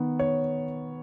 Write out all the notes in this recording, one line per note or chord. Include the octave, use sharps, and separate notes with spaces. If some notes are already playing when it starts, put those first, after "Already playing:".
Already playing: D#3 B3
C#5